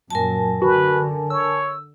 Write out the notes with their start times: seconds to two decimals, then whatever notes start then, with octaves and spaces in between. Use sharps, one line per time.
0.10 F#2 A#2 F#3 A#4 G#5 A5
0.62 D3 F#4 B4
1.30 C#5 E6